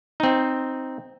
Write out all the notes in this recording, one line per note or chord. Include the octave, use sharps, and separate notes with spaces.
C4 D#4